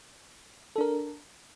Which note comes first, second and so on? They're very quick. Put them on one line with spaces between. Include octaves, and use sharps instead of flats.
A4 D4 A#4